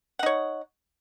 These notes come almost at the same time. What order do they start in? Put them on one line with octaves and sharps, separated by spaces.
F#5 D#4 C#5